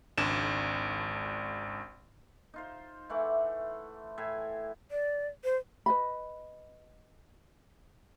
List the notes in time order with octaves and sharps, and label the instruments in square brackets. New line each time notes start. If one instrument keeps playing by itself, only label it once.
[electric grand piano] G#1 C#2 D4 E7
[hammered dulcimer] D#4 F4 C5
E3 A3 F#5 D6
A2 E5 G#5
[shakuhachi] D5
C5
[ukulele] B4 D#5 B5